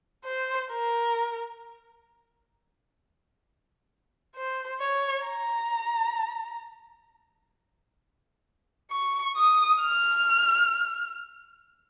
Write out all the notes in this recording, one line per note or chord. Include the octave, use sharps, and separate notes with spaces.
C5
A#4
C5
C#5
A#5
C#6
D#6
F6